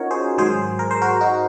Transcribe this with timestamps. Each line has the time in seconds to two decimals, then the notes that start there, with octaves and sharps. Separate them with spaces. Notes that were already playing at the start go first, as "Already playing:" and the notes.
Already playing: C#4 D#4 F4 F#4 A#4 C#5
0.11 G#4 C5
0.38 G#2 D#3 F#3 G#4 C5
0.79 A#4
0.91 C5
1.02 F#4 A#4
1.21 D#4 F#4